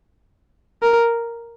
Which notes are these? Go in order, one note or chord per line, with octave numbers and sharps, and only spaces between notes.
A#4